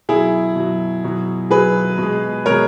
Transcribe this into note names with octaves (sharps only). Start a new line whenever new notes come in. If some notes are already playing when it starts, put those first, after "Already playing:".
B2 F#3 E4 G#4
B2 F#3
B2 F#3
B2 F#3 G#4 B4
B2
G#3
B2 G#3 A#4 C#5